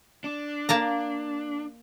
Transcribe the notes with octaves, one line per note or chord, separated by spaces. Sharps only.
D4
A#3 A5 A#5